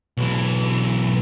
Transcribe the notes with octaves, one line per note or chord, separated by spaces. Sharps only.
B1 E3